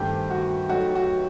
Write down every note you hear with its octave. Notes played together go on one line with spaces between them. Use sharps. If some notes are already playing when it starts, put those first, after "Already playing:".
Already playing: G2 D#3 A3 C4 G4
F#4
F#3 A3 D#4 F#4 A4
F#4